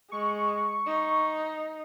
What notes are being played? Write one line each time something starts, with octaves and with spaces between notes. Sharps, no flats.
G#3 C#6
D#4